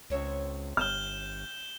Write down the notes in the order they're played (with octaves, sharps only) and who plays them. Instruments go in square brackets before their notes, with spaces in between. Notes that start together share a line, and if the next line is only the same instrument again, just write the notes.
[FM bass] C#2 [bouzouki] C4 C#5 E5
[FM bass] G1 [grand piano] F6 [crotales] G6 E7 G7